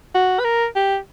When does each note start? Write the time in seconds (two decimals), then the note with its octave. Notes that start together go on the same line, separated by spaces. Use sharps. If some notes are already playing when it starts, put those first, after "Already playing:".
0.15 F#4
0.40 B4
0.44 A#4
0.76 G4